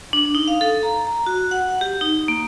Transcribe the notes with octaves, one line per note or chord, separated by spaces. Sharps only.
D4
D#4
F5
A4
A#5
A#5
F#4
F#5
G4
D#4
A#3